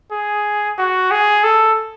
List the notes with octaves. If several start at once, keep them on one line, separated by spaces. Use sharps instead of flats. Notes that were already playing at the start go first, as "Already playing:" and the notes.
G#4
F#4
G#4
A4